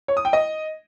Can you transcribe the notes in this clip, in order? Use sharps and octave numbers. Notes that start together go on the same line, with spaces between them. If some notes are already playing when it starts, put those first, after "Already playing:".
C#5
D#6
G5
D#5